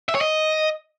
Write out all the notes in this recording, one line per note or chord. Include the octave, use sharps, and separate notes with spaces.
E5
C#5
D#5